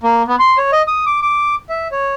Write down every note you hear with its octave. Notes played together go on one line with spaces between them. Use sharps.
A#3
B3
C6
C#5
D#5
D#6
D6
D6
E5
C#5